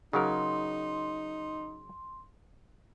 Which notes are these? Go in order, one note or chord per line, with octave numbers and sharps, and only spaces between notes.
C#3 F#3 D#4 A#4 C6